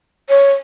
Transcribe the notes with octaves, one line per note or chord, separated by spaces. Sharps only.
C#5